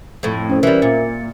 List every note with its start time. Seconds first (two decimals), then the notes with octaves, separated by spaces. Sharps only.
0.23 F2 A2
0.50 C#4 C5
0.63 E3 G3 A#4 E5
0.82 A#2 A6 C#7